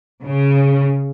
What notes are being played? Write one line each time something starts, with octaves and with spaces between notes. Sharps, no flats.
C#3